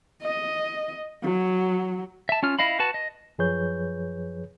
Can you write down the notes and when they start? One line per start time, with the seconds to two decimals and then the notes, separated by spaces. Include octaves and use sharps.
0.23 D#5
1.23 F#3
2.29 E5 A5
2.43 C#4 F4 F6
2.59 E4 D#5 F5 B5
2.79 F#4 B4 A5
2.94 D#5
3.38 F#2 F3 G#4 B4 C#5 G6